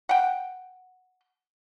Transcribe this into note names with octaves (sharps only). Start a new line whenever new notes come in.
F#5 G5